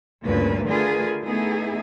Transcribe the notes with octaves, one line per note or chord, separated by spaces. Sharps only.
D2 G2 A#2 C#3 A#3 B4
D3 A3 F4 G#4 A#4 B4
A3 B3 D#4 E4 G#4